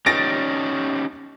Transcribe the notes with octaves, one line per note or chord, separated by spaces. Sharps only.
C#4 D#4 G4 A6 A#6 D7